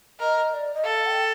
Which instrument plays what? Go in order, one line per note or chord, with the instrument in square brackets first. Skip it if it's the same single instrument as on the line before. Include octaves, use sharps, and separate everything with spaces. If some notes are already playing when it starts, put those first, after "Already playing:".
[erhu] A#4 [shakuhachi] D#5
[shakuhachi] D5
D#5
[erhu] A4 [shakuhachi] F5
[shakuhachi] G5